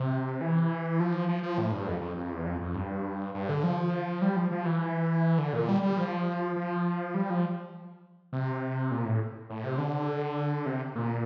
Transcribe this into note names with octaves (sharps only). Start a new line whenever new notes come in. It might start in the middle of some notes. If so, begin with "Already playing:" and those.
Already playing: C3
E3
F3
F3
F3
A2
G2
F2
F2
F2
E2
F2
F2
G2
G2
D3
F3
G3
F3
F3
E3
D3
A#2
G3
G3
F3
F3
G3
F3
C3
A#2
A2
A2
C3
D3
C3
A#2